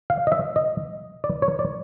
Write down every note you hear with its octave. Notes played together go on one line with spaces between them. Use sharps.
F5
D#5
E5
D#5
D5
C#5
D5